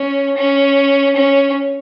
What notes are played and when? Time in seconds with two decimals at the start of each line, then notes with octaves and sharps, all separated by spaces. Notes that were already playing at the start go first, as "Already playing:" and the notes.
Already playing: C#4
0.37 C#4
1.16 C#4